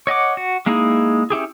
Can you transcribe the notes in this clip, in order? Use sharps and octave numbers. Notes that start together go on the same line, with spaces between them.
C#5 D#5 F#5 D6
F#4
G#3 A#3 D#4 E4 G#4
C#4 E4 G4 G#4